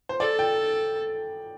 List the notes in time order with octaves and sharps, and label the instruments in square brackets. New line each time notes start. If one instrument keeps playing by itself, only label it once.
[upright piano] C5
[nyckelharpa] A4 [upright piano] D5
[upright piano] G5